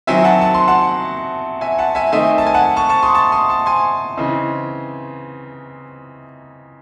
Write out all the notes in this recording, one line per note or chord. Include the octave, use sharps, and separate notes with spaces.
D#3 F#3 C4 E5 G#5
F#5 A5
A5
C6
F#5 A5
E5 G#5
F#5 A5
E5 G#5
D#3 A3 C4 D#4 E5 G#5
A5
G#5
F#5 A5
A5 C#6
A5 C#6
C6 D#6
A5 C#6
C6 D#6
A5 C#6
G#5 C6
C#3 E3 C4 D#4